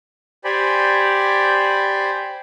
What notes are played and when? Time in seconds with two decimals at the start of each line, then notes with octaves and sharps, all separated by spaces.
0.44 G4 C5 D5 G#5 B5